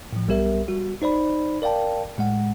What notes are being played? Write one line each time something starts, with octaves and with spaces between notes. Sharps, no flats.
A2 F3
B1 G3 B3 G4 A#4 E5
G3 F#4
D#4 C5 D5 B5
A#4 D5 F5 G5 A5
A2 G#3 F#5